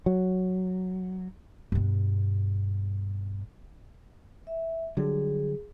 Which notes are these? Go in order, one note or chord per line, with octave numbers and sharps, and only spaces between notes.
F#3
G2 B2
E5
D3 F#3 G3 G#4